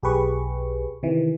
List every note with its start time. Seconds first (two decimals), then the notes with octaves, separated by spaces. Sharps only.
0.03 B1 G4 G#4 B4 C#6
1.03 C3 D#3 E3